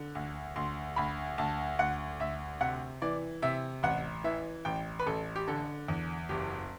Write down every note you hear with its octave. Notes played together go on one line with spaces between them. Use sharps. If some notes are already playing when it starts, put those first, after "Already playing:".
Already playing: D3
D2
D2 C6
D2 B5
D2 A5
D2 F#5
D2 E5
C3 F#5
E3 D5
C3 E5
A1 F#5
E3 E5
A1 G5
B4
A1 A4
G4
D3 A4
E2
F#1 G4